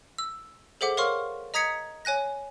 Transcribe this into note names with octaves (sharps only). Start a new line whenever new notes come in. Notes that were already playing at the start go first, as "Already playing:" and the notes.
E6
G#4 A4 C5 E5 F#5 D6
A#4 C#5 F5 C6 C#6 F6
D#5 A#5 D#6 G#6 B6 C#7
C#5 G#5 F#6 A#6